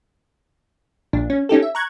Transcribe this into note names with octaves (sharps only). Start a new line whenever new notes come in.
A#1 A#2 D4
C#4
C#4 D#4 G4 A4
E5
A#5 C#6 F#6 G#6